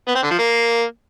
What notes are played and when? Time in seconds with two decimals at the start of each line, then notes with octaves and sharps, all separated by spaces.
0.08 B3
0.16 C4
0.23 D3
0.31 F3
0.39 A#3